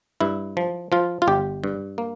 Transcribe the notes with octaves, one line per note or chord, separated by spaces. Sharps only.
G2 E4
F3
F3 F4
F4
G1 G4
G2
A#3